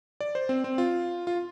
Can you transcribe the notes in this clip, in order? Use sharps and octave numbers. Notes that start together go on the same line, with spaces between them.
D5
C5
C4
C4
F4
F4